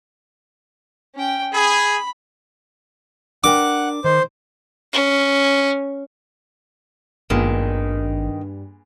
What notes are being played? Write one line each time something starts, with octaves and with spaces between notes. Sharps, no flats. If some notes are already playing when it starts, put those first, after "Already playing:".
C#4 G5
G#4 B5
D4 A#4 F#5 G5 D6
D#3 C5
C#4
G#1 G2 A#2 D#3 G#3 B3